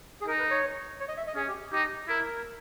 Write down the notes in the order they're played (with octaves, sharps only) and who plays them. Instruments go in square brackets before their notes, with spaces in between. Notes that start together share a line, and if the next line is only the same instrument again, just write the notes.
[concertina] G#4
[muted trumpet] D#4 [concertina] A#4
[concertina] B4
C#5
C#5
D#5
E5
D#5
[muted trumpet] C#4 [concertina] G#4
[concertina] G4
[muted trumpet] D#4 [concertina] G4
[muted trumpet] E4 [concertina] A#4